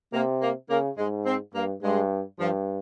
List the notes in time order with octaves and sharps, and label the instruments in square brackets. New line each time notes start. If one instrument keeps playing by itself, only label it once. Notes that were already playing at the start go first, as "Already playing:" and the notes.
[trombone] C3 [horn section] A#3
[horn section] A#3
[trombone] C#3 [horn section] A#3
[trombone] G#2 [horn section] G#3
[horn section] C4
[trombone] G2 [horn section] A#3
[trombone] G2 [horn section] G#3
[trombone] G2 [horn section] F3